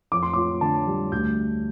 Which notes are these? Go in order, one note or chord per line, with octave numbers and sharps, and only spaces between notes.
F2 D6
C6
F4 D6
D3 A5
G3
D2 G6